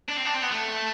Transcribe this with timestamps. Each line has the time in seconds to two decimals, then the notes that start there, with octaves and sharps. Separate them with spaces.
0.08 D4
0.16 C4
0.25 D4
0.34 C4
0.42 B3
0.51 A3